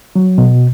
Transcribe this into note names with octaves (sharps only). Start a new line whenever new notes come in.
F#3
B2